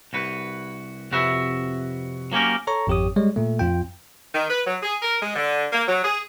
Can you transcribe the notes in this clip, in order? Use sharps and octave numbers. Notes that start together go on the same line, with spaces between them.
C2 F#4 B4
F2 C3 F#4 B4 E5
F#3 A#3 C#4 G4 A#4
A4 C#5 A#5 C#6
G#1 F2 G4 C#5 D#6
G3 G#3 C#5
A#2 A3
F2 F4 G5
D#3
B4
F#3
G#4
A#4
G#3
D3
A#3
F#3
G#4